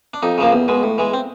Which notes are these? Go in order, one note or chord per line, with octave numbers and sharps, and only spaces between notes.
D4
F2 D#4
C#3 F3 A#3
E2
B2 G#3
A2
E3 G#3
C4